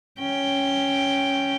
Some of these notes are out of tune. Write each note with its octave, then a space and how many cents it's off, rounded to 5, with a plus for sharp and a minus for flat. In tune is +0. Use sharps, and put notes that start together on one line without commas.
C#4 +0 G5 +0